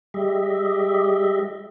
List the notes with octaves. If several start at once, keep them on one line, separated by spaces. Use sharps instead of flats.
G3 G#3 G4 D#5 E5